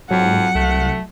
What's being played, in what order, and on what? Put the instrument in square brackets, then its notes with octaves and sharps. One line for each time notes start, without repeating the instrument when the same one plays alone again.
[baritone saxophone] F2 [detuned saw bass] G#2 [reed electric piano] F#3 [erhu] F#5
[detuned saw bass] C2 [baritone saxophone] A3